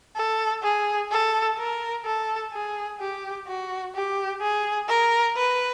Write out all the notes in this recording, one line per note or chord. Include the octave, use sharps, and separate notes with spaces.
A4
G#4
A4
A#4
A4
G#4
G4
F#4
G4
G#4
A#4
B4